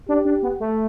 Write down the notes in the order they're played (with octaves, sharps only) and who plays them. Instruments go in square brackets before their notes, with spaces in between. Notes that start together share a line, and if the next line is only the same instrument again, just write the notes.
[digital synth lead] D4 [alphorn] G4
[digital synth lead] D4
B3
A3